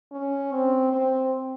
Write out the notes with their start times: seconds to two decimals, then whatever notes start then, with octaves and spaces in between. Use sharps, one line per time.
0.12 C#4
0.53 C4
0.92 C4